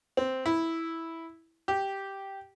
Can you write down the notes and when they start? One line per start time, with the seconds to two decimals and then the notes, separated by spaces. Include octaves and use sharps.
0.17 C4
0.46 E4
1.68 G4